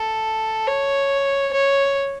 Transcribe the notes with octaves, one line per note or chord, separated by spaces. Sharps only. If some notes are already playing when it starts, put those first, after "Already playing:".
Already playing: A4
C#5
C#5